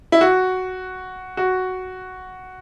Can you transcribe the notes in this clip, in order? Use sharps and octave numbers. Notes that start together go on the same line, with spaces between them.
E4
F#4
F#4